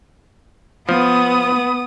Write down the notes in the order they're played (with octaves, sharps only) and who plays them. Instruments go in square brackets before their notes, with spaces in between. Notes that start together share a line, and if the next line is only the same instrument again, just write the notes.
[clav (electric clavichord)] F3 [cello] B3 [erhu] D#6